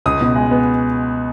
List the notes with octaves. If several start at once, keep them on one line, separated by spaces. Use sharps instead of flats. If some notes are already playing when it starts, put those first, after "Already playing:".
C#2 D#6
B2
G#3
B3